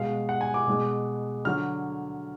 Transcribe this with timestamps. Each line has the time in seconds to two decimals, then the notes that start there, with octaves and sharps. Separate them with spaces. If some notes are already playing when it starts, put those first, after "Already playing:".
Already playing: B2 G#3 F5
0.29 F#5
0.41 G#5
0.54 D6
0.67 B2 G#3
1.45 D3 F#3 F6